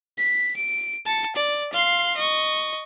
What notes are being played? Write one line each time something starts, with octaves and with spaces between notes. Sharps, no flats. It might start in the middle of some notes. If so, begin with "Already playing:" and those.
B6
D7
A5 C#7
D5
F5 C6
D#5 C#6